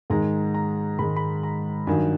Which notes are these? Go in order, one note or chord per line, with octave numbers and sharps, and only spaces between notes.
G#2 D#3 G#3 A#5
A#5
G#2 D#3 G#3 B5
B5
A#5
G2 D#3 F#3 G#5